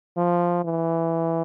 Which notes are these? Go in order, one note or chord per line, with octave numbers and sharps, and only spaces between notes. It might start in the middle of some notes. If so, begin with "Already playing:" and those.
F3
E3